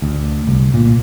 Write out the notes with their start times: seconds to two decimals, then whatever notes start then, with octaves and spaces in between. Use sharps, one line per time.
0.02 D2
0.47 C2
0.74 A#2